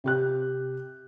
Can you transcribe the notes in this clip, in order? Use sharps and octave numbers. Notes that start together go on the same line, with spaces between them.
C3 G4 F#6